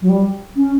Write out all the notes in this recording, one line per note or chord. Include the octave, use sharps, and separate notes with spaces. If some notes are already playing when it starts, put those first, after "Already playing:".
F#3
G3
C#4